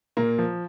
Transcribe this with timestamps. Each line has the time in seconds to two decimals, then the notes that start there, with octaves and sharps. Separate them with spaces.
0.17 A#2 A#3
0.38 F3